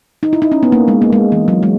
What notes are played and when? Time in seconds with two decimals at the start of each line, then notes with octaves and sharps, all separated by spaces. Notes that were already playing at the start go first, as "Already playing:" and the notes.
0.23 D#4
0.33 E4
0.42 D#4
0.52 C#4
0.63 B3
0.72 A#3
0.88 G#3
1.02 A#3
1.13 G#3
1.32 E3
1.48 F#3
1.63 G#3